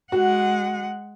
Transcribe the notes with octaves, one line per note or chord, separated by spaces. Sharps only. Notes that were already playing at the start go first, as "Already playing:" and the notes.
G#3 F#4 F#5